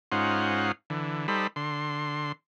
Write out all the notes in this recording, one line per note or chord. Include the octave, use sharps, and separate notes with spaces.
G#2 C#4 D#4 F4 C5 F#5
D3 E3
G3 D#4 A4 C5 B5
D3 C6